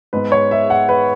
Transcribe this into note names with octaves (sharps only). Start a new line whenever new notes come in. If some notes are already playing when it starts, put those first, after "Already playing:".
G#2 G#3 B3 B4
C#5
E5
F#5
B4